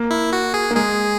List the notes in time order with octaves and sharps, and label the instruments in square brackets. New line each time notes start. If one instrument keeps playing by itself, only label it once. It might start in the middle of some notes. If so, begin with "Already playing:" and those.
Already playing: [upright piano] A#3
[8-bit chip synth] E4
F#4
G#4
[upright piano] A#3
[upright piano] G#3 [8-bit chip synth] G#4